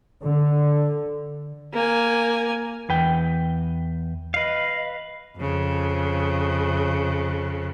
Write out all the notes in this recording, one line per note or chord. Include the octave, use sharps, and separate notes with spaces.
D3
A#3 G#5
E2 B4 G5
B4 D#5 F5
F2 C#3